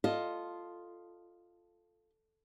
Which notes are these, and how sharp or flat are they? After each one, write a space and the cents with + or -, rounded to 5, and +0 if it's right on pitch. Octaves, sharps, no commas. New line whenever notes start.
F4 +0 A4 +0 D#5 +0